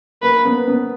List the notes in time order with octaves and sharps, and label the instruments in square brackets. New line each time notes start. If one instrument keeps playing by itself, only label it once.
[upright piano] A#3 [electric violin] B4
[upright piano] B3
B3